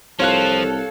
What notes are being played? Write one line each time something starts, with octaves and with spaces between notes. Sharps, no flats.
C2 F3 A4 C#5 F5 F#6